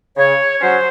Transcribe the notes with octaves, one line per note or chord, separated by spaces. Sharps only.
C#3 C#5
F#3 C#4 C5